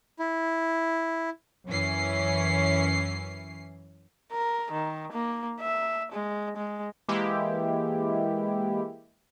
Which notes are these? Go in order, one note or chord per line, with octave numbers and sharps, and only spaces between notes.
E4
F#2 E3 C#4 C7
A#4
D#3
A#3
E5
G#3
G#3
E3 G#3 A#3 E4 G4